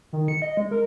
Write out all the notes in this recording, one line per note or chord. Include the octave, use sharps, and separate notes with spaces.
D#3
C#7
D#5
G#3
A#4